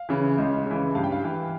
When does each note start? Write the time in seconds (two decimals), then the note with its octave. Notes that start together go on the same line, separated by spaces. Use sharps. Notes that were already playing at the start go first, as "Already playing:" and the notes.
Already playing: F5
0.09 C#3 E3
0.38 C#2
0.66 C#3 E3
0.95 G2 F5
1.04 G5
1.12 F5
1.24 E3